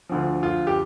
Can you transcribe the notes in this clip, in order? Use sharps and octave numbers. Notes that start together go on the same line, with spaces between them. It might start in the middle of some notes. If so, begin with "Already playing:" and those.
D2 D3 F3
F4
G4